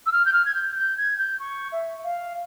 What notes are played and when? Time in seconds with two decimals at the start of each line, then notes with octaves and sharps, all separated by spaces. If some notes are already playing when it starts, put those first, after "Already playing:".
0.06 E6
0.12 F6
0.25 G6
0.33 F6
0.45 G#6
0.54 G6
0.76 G6
0.97 G#6
1.19 G6
1.40 C#6
1.72 E5
2.04 F5